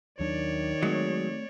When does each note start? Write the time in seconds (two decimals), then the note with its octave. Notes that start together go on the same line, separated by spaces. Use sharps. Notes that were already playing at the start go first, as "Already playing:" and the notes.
0.20 D#2 D#3 F#3 D4 C#5 D5
0.82 F#3 G#3 A3 C4